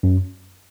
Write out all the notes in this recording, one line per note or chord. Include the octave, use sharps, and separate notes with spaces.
F#2